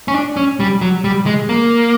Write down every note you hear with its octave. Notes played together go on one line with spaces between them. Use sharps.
C#4
D4
C#4
G3
F#3
G3
G#3
A#3